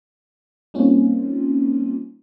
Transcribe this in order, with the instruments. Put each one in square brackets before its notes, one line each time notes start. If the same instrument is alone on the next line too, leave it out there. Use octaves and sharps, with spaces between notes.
[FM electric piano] G3 A#3 C4 C#4 D#4 F4